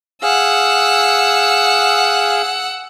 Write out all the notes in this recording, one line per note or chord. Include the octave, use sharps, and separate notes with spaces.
G#4 F5 F#5 E6